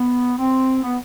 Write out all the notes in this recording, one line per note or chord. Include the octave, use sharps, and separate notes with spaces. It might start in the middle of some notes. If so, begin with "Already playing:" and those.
Already playing: B3
C4
B3